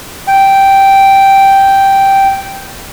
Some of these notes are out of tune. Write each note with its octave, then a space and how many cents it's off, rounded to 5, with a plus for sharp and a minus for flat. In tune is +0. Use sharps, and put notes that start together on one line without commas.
G5 -5